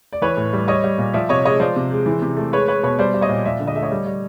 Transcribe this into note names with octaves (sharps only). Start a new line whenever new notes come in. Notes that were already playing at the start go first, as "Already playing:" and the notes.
D5
E3 B4 C#5
A2
G3
G3 C#5 D#5
G3
A#2
F3 D5 E5
C3 C#5 D#5
G#3 C#5 D#5
F3 C5 D5
C3
G#3
E3
C3
A3
G#3 B4 C#5
G#3 B4 C#5
B2 B4 C#5
G3 C5 D5
G3
C#5 D#5
A#2
F3 D5 E5
D3
D#5
A3 E5
C#5 D#5
G3
G3